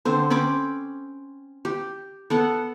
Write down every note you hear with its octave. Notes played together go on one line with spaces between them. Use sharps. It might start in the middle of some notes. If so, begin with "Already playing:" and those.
D3 C4 C5
C4 C#4 B5 D6
G4
B3 A4 F#5